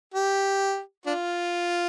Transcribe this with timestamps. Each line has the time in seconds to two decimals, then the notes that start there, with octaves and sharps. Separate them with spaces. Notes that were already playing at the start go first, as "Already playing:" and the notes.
0.14 G4
1.06 D4 F4